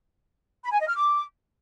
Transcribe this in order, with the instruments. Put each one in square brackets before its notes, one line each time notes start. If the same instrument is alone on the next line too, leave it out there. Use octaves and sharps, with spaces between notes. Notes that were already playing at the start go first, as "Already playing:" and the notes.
[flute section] B5
G#5
D#5
F6
D6